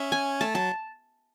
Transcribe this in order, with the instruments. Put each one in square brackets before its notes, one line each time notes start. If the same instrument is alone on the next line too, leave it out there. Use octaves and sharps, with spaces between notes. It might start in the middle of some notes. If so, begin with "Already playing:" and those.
Already playing: [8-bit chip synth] C#4 [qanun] E5
[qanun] G#5
[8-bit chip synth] A3 [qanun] A5
[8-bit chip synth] F#3 [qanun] A5